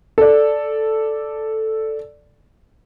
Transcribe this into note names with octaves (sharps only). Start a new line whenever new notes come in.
A4 D5